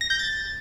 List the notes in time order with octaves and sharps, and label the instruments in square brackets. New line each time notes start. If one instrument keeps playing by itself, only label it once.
[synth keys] A#6
G6
A6